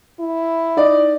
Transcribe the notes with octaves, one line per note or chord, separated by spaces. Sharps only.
E4
D#4 D5